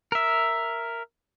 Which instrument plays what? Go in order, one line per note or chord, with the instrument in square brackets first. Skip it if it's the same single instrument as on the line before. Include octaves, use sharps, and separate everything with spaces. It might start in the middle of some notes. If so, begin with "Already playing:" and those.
[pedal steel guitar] A#4 E5